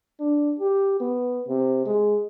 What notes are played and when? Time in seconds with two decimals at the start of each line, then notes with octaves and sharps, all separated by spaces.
0.20 D4
0.59 G4
1.00 B3
1.49 C3
1.86 G#3